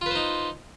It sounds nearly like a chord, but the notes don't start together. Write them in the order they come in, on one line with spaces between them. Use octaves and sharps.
F4 B4 C5 D#4